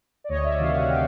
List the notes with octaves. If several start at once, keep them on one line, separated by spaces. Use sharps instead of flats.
D5
D2 C#5 D#5
D5 E5
C3 D#3 F#3 D#5 F5
E5 F#5
F5 G5